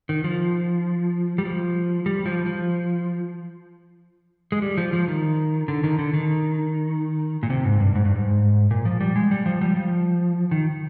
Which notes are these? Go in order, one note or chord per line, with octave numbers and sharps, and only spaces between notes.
D#3
F3
G3
F3
G3
F3
F3
G#3
G3
F3
F3
D#3
D3
D#3
D3
D#3
A#2
C3
G#2
G2
G#2
G2
G#2
A#2
F3
G3
G#3
G3
F3
G3
F3
D#3